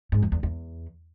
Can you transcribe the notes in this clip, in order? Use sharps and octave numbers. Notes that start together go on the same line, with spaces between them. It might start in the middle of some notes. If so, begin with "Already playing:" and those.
G#2
F2
E2
E2